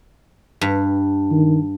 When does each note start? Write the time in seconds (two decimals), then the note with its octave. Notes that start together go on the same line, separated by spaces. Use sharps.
0.61 G2
1.31 D#3